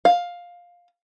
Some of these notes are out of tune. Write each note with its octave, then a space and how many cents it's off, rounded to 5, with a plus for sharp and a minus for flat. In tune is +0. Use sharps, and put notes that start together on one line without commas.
F5 +10